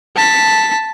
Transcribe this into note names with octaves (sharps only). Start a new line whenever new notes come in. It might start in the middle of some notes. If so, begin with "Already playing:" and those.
A5 B6